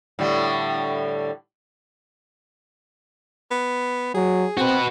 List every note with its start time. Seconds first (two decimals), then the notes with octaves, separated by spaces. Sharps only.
0.19 A2 D3 G3
3.51 B3
4.14 F#3 G#4
4.57 C4 F#4 B4